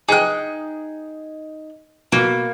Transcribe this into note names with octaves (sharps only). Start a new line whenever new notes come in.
D#4 G#4 G5 F#6
B2 A#3